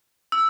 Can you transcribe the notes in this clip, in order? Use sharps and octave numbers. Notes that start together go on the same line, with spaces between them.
E6